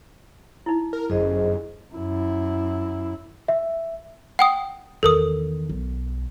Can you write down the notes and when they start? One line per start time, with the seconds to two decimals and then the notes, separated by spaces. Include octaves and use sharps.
0.66 D#4 E4
0.93 A#4
1.10 G1 F#2 G#4 C5 D#5
1.94 F#2 E4
3.48 E5
4.39 F#5 G5 D#6
5.03 E2 D#3 A4 A#4 D#6
5.69 B1